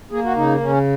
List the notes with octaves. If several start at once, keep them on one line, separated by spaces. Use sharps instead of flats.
A#3 G#4
F#4
C#3 D#4
C#3 C#4